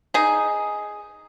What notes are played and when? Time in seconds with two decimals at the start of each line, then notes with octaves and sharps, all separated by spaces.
0.14 D#4 G#4